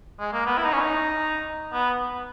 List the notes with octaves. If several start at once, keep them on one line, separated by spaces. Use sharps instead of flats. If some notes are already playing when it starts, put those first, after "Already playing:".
G#3
A#3
B3
E4
D#4
C#4
D#4
B3